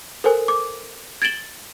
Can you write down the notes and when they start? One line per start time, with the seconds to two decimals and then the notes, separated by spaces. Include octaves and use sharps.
0.24 A4 A#4 C5 G#5
0.48 D6
1.22 G#6 A6 D7 E7 F#7 G7